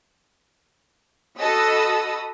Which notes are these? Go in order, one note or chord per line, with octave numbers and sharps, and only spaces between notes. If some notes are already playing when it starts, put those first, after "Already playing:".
F#4 A4 D#5 B5 D#6 E6